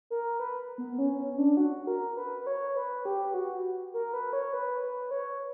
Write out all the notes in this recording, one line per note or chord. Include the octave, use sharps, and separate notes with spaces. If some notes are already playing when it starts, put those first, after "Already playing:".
A#4
B4
B3
C#4
C#4
D4
F#4
A#4
B4
B4
C#5
B4
G4
F#4
A#4
B4
C#5
B4
B4
C#5